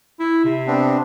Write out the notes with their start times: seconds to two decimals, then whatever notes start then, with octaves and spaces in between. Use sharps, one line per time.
0.20 E4
0.44 C3
0.67 B3 C4 D4